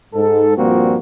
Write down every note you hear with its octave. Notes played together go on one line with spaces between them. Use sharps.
G#2 A4
G2 A#2 F3 A#3 C4 F#4